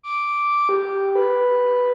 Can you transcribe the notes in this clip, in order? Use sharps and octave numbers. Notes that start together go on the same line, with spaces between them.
D6
G4
B4